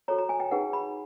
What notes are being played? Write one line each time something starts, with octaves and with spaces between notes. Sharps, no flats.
F#4 A4 C#5 A#5
A#5
G#5
G5
D#4 G#4 B4 F#5
B5